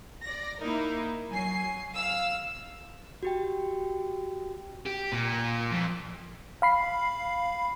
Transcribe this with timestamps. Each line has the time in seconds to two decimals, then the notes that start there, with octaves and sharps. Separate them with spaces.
0.24 D5 A#6
0.59 A#3 D#4 E4 A#4
1.30 F#3 G#5 C7
1.93 F5 E6
3.23 F#4 G4 G5
4.86 G4
5.12 A#2
5.72 F2
6.62 F5 B5 C7